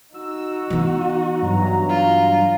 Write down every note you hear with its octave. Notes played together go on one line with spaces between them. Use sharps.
D#4 F#4 E6
E3 B3
G2 F#3 A#5
F4